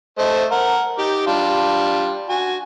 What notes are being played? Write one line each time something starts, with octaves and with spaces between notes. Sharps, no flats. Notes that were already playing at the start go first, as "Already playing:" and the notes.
A3 C5 D#5
A#4 F#5
D#4 G4 D6
G3 D4 F4
F#4 G#5